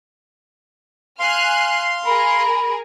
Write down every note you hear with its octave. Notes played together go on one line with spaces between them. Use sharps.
F5 G#5 C6 F6 F#6
G#4 A#4 B5